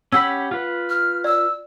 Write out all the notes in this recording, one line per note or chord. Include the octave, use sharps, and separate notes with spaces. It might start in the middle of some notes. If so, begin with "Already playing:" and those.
C#4 G4 F#5 B5 E6 B6
F4 B4
F6
D5 E6